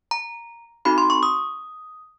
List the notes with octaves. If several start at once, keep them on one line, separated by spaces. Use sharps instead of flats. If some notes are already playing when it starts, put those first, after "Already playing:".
A#5
C4 D#4 F#4 A4 B5
C6
C#6
D#6